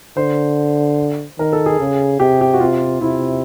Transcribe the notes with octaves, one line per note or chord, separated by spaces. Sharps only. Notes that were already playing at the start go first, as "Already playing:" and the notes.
D3 C5
D#3 A#4
A4
G#4
C#3
C3 G4
G4
F#4
C3 F4
C3 E4